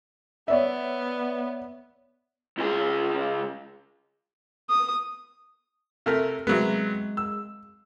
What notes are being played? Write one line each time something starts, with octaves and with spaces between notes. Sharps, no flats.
B3 C#5 D5 E5
C#2 G#4
D#6
C3 A3 A#4
C3 F#3 G#3 B3
E6